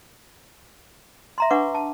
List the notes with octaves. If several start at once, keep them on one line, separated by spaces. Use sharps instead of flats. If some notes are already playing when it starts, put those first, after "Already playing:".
E5 A#5 C6
D4 B4 F#5 C#6 D6
A5